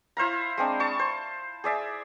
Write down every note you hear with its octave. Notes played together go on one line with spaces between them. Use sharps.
E4 C5 F5 A#5
G#3 C4 D4
A5 C#6
C5
G#4 D5 E5